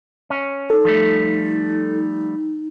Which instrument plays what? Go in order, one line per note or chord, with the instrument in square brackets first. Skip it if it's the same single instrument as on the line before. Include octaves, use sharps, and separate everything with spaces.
[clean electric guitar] C#4
[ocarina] D#4 [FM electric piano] A4
[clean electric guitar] F3 G3 A3